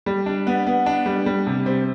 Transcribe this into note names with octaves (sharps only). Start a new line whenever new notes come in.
G3
D4
B3
B3
D4
G3
G3
C3
C4